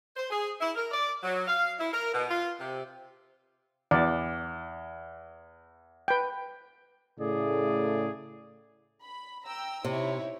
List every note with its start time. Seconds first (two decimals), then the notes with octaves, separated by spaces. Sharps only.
0.16 C5
0.30 G#4
0.60 E4
0.76 A#4
0.91 D5
1.23 F#3
1.48 F5
1.78 E4
1.93 A#4
2.14 B2
2.29 F4
2.59 C3
3.91 E2 D5
6.08 B4 G5
7.20 A2 C#3 A3 G#4 D5
9.03 B5
9.46 G5 A#5 E6
9.84 C3 D#4 E4 C#5